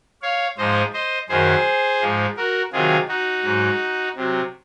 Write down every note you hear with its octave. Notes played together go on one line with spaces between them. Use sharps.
C#5 F5
G#2 F3 G#3 C5 D#5
C5 D#5
F#2 D#3 F#3 G#4 C5
G#2 F3 G#3
F#4 A#4
C3 D#3 F#3 F4 G#4
D#4 F#4
G#2 F#3
C3 F#3